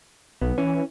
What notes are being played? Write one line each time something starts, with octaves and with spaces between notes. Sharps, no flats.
B1 B3
E3 C#4